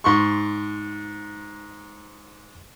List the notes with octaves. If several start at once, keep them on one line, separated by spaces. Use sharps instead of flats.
G#2 C6 C#6